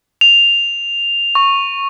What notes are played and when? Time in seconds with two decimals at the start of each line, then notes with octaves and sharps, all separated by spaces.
0.21 F7
1.35 C#6